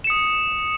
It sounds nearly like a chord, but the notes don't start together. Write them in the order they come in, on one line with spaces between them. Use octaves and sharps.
E7 C#7 D#6